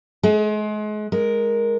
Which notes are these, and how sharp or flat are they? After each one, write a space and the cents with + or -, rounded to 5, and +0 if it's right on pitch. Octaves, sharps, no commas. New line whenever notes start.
G#3 +35 G#4 +30
G#3 +0 A#4 +0